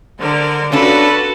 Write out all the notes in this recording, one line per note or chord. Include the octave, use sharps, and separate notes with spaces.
D3 A#4 C5
B3 C#4 D4 F4 F#4 A4 B4